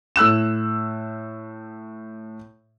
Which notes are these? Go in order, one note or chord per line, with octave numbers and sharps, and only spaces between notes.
A2 E6 F#6 E7